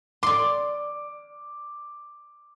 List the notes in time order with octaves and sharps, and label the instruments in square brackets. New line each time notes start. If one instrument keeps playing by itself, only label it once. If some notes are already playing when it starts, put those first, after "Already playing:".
[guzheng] D5 C6 [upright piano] D6